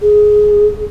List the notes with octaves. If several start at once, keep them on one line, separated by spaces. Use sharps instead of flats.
G#4